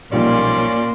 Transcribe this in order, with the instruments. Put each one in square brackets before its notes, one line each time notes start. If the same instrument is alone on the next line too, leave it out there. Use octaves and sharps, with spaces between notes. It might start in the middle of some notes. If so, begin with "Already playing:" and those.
[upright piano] B1 F3 G3 [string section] A#2 [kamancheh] A#3 C6 [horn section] C#4 D5